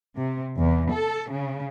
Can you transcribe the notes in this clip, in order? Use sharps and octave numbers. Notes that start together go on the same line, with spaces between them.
C3
E2
A4
C#3